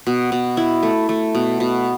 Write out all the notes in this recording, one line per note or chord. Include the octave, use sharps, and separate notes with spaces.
B2
B2
E4
A3
A3
B2
B2